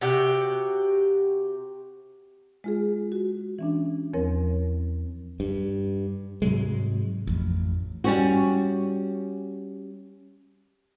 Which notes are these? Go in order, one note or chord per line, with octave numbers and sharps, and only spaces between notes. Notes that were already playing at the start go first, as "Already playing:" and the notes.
C3 F#4 G4
G#3 F4 G#4
F#4
E3 C#4 D4
E2 F3 C4 A#4 C#5
G2
G#2 C3 F#3 G#3
A1 F2
G3 C#4 F#4